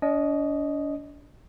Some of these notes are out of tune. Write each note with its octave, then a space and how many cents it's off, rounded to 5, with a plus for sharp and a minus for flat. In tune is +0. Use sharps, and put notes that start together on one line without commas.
D4 -40 D#5 +0